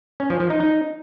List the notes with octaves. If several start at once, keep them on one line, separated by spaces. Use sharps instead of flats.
C#4
F3
F3
D#4
D#4